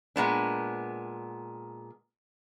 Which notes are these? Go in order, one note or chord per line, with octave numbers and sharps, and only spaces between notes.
A#2 G#3 B3 D4